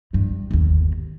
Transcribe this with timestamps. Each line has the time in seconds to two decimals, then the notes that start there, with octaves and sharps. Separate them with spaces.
0.13 A1 G2
0.51 G1 D#2